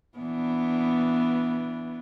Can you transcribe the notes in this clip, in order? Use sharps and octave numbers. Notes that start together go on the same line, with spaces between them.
E3 B3 D4